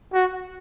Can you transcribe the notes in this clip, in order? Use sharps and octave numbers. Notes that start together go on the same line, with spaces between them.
F#4